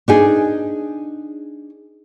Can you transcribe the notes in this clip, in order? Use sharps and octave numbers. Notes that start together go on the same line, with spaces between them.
D4 D#4 G#4